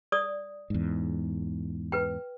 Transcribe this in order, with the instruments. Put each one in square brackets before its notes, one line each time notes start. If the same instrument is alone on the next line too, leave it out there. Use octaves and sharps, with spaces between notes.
[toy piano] D5 D#6
[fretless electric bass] E2 G#2
[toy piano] B4 G5